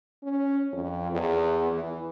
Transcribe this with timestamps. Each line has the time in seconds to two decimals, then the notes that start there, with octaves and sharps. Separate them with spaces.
0.23 C#4
0.72 F2
1.11 E2
1.71 E3